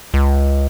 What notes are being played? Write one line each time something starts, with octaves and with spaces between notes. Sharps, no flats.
C#2